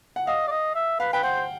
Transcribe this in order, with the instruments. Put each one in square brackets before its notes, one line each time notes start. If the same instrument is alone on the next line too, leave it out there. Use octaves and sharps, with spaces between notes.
[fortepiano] F#5
[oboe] D#5 [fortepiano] F5
[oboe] D5
D#5
E5
[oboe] B4 [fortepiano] F5
[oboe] B4 [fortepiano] G5
[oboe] C5 [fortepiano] F#5